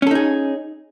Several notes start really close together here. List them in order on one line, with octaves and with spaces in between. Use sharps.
C#4 A4 D#4 G#4